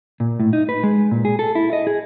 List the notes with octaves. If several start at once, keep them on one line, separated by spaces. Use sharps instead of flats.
A#2
A2
D#4
B4
G#3
A#2
G#4
A4
E4
D#5
G#4